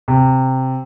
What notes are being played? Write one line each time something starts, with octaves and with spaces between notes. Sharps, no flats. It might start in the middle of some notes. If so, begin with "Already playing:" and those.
C3